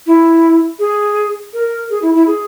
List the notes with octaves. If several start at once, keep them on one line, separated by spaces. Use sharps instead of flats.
E4
G#4
A#4
G#4
E4
E4
G#4